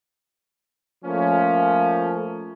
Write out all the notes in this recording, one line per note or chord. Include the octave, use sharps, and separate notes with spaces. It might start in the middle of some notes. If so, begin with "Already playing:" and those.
F3 A3 A#3 C#4